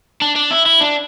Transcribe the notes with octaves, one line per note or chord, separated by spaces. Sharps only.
D4
D4
E4
E4
D4